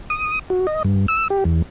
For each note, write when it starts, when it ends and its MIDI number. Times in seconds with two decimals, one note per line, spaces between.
0.10 0.39 87
0.50 0.67 66
0.67 0.83 75
0.84 1.06 43
1.08 1.28 88
1.30 1.44 67
1.45 1.62 40